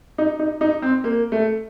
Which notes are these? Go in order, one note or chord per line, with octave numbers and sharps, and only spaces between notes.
D#4
D#4
D#4
C4
A#3
A3